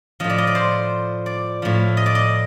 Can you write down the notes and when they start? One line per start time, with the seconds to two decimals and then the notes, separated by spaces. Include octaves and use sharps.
0.20 A2 F3 D#5
0.30 D5
0.38 D#5
0.47 D5
0.55 C5
1.26 D5
1.62 A2 F3
1.97 D#5
2.06 D5
2.15 D#5